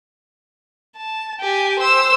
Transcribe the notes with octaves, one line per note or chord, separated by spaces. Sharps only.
A5
G4 G#5
C5 E6